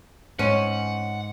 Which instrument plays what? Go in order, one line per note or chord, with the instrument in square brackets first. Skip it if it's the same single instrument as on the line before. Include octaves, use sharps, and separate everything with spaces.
[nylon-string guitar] G#2 [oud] C#4 [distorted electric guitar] F#5